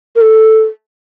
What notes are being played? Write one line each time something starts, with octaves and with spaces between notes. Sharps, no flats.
A#4
A4